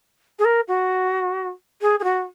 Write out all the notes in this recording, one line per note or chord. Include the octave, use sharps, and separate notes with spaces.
G#4
A#4
F#4
G#4
G#4
F#4